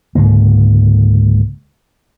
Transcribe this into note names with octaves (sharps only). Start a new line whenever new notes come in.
C#2 G#2 D3 A#3